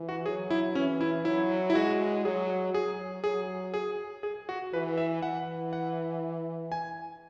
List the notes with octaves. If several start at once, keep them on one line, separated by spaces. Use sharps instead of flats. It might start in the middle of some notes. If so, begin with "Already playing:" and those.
Already playing: E3
F#4
F#3 G#4
E4
E3 C#4
E4
F#3 E4
E4
G#3 F#4
F#3 G#4
F#3 G#4
F#3 G#4
G#4
G#4
F#4
E3 B4
E5
E3 F#5
F#5
G#5